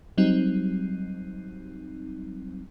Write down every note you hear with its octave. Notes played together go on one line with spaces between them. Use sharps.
F#3 G3 C4 D#4